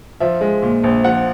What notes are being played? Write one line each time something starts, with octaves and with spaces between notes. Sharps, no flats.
F3 E5
G#3
A#2
A#1
F3 F#5